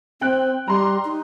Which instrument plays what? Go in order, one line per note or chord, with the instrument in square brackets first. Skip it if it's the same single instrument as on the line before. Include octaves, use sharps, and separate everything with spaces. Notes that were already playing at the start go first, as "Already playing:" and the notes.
[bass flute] C4 [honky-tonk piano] G5 F#6
[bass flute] G3 [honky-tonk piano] A#5 C6
[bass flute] D#4